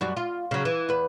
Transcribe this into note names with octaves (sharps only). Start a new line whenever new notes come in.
F#2 G3 F#4
F4
C#3 F#3
E3
E2 B4